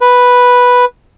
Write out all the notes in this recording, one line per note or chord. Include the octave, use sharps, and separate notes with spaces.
B4